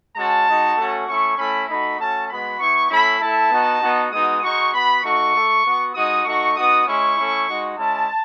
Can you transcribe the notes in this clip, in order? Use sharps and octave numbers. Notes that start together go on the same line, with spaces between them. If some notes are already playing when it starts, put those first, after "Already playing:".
G#3 C#4 F#4 A5
G#3 D#4 F#4
A3 C#4 F#4
A3 C#4 E4 C#6
A3 C#4 E4 B5
A3 D#4 F#4 B5
A3 C#4 F#4 A5
G#3 B3 F#4 B5
B3 E4 C#6
A3 C#4 E4 B5
A3 E4 A5
B3 D#4 F#4
B3 D#4 F#4
G#3 B3 D#4 F#4 D#6
G#3 D#4 F#4 C#6
B3 F#4 B5
A3 D#4 F#4 C#6
A3 E4
B3 F#4
G#3 D#4 F#4 D#6
A3 D#4 F#4 C#6
B3 D#4 F#4 D#6
G#3 C#4 E4 C#6
A3 C#4 E4
G#3 D#4 F#4
G#3 C#4 E4 A5